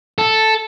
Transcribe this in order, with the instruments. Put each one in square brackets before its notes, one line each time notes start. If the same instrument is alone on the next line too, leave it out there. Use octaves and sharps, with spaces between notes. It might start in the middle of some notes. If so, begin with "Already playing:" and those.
[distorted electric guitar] A4